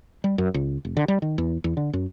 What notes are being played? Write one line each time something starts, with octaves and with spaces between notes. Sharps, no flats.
G3
F#2
C#2
F1
D3
G3
D#3
E2
E2
D3
F#2